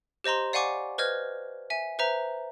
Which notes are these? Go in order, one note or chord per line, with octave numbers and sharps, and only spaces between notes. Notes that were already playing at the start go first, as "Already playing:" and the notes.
G4 C5 D#5 A#5 C6
D5 F5 F#5 G#5 C#6 D6
B4 C5 D#5 F6 G#6
E5 G#5
B4 C5 E5 A#5